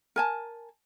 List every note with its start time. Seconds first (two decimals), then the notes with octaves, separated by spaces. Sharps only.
0.16 A#4 G#5 A5